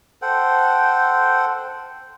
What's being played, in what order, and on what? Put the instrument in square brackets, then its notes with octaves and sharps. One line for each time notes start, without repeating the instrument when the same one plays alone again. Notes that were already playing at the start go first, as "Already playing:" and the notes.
[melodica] A4 C5 F#5 G5